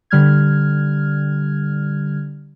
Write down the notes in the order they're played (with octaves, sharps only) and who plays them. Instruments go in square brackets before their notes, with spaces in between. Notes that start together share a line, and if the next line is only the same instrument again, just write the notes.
[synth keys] D3 G3 F6 G#6